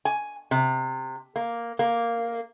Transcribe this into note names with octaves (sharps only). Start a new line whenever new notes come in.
G#5
C3
A#3
A#3